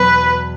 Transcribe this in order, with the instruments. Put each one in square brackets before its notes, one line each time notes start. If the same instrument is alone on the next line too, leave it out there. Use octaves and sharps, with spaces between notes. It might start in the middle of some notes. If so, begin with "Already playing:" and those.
Already playing: [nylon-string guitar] E2 B2 F#3 B3 [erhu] B4